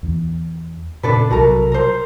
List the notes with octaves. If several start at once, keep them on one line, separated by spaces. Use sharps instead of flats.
E2 E3
A#2 C#3 C4 D4 A4 B4
B1 C3 F#3 F#4 A4 A#4
A#4 C5